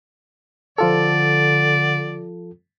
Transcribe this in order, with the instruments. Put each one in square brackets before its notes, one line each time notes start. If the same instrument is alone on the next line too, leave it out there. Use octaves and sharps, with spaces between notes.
[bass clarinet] D3 [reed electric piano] F3 F4 A4 [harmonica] D5